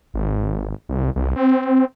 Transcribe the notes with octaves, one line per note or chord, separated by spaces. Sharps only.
G#1
C2
C2
C4